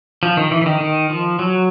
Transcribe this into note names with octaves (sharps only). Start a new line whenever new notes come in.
F3
D#3
E3
E3
D#3
D#3
F3
F#3